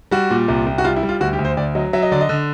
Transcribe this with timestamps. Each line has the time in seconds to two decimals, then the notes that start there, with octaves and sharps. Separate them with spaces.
0.11 G3 F#4
0.30 A#2
0.48 C2
0.67 C2
0.78 F#4
0.84 G3 F4
0.96 E4
1.03 G3
1.09 F4
1.20 D2 F#4
1.33 G4
1.39 D2
1.45 C5
1.57 D2 D5
1.75 F#3 D#5
1.93 F#3 E5
2.03 D#5
2.12 D3 D5
2.21 D#5
2.29 D3